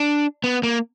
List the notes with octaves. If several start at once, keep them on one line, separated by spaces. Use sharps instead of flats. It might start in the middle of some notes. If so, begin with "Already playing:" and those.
Already playing: D4
B3
A#3